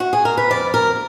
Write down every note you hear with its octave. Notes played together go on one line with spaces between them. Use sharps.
F#4
G#4
A#4
B4
F2 D5
A#4